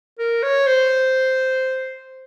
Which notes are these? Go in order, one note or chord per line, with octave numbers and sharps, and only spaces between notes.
A#4
C#5
C5